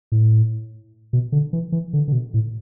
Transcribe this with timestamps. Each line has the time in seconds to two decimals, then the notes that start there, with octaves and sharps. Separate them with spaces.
0.12 A2
1.13 B2
1.32 D3
1.53 E3
1.72 E3
1.93 D3
2.08 D3
2.12 B2
2.34 A2